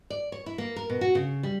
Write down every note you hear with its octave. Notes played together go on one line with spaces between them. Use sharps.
D5
C#5
E4
A#3
A#4
B2
F#4
C#3
G3